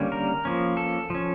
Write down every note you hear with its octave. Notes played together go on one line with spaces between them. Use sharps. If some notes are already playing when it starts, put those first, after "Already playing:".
Already playing: D3 G3 A#3 C#4
A#4
F3 A#3 C#4
A4
F3 C#4